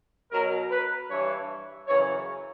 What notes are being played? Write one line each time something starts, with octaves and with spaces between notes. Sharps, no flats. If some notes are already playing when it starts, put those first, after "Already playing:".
B2 F#3 A#4
B4
G2 E3 C#5
F#2 C#3 E3 C#5